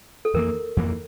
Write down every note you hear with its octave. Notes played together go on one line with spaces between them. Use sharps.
A4
F2 E3 A#3 A#4
F2 E3 A#3